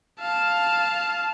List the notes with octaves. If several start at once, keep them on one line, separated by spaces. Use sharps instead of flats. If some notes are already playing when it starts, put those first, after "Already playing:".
F5 A5